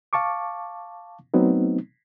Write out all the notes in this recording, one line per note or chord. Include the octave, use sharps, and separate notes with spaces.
F5 A5 C#6 D6
F#3 A3 B3 C4 D#4